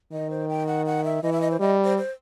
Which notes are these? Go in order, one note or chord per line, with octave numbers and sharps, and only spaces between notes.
D#3 D#5
C5
G5
F#5
F#5
E5
E3 D#5
E5
D#5
C5
G3 D#5
C5
C5